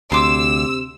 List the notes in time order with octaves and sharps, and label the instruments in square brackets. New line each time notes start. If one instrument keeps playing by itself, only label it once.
[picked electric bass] D2 [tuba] C3 [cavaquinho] C6 D6 [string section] E6